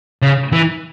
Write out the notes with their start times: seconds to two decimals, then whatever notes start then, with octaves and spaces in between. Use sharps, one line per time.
0.23 C#3
0.53 E3